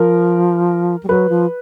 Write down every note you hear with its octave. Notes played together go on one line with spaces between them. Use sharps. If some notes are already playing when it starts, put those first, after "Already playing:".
Already playing: F3 A#4
G3
F#3 B4
F3